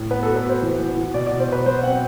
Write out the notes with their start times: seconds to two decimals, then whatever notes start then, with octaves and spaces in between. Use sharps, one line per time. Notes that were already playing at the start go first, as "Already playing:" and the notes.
Already playing: A2
0.11 B3 B4
0.23 F#4 A4
0.36 B4
0.45 F#4 C5
0.62 E3
0.79 E3
0.97 E3
1.14 B2 D5
1.26 D5
1.31 B2
1.40 C5
1.48 B2 B4
1.66 F#3 C5
1.83 C4 F#5